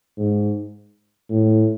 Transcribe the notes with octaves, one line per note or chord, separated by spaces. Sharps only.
G#2
A2